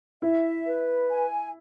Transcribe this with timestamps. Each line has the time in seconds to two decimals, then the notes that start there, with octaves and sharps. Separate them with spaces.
0.22 E4 E5
0.66 B4
1.09 G#5